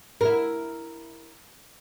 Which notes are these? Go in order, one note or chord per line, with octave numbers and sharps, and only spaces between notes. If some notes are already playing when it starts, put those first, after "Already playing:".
E4 A#4